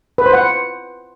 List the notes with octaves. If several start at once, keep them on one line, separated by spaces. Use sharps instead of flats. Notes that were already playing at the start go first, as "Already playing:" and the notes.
B4
C5
F#5